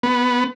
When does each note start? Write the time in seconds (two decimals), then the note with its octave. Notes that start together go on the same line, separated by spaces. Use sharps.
0.03 B3